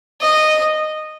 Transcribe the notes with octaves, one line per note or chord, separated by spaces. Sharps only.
D#5